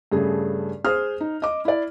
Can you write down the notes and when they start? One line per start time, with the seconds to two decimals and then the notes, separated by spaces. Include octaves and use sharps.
0.12 G2 C#3 A3 G#4
0.84 G#4 C5 D#6 F6
1.21 D#4
1.42 D#5 D6
1.65 E4 D5